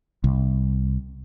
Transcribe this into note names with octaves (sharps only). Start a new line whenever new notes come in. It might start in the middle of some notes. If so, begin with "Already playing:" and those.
C2